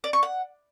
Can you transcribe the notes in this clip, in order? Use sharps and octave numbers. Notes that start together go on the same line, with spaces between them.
D5
C#6
F#5